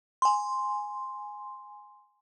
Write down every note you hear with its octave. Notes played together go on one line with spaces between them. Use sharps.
G#5 C6